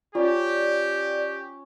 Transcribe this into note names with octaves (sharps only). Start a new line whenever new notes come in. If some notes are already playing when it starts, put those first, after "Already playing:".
C#4 F4 G4 D5